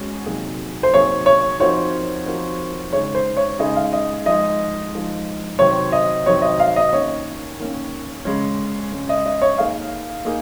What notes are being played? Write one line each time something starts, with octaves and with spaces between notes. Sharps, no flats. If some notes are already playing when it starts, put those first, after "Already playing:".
Already playing: G#3 C#4 F#4
C3 F#3 A#3 D#4 G#4
C5
C3 F#3 A#3 D#4 G#4 C#5
C#5
F3 C4 D#4 F#4 A#4 C#5
F3 C4 D#4 F#4 A#4
C#3 G#3 D#4 G#4 C#5
C5
C#5
C#3 G#3 D#4 G#4 D#5
F5
D#5
F3 G#3 D#4 D#5
F3 G#3 D#4
C3 D#3 F#3 C4 C#5
D#5
C3 D#3 F#3 C4 C#5
D#5
F5
D#5
D#3 A#3 C#4 C#5
D#3 A#3 C#4
C#3 G#3 C#4
C#3 G#3 C#4
D#5
D#5
C#5
A#3 D#4 G#4 F5
A#3 D#4 G#4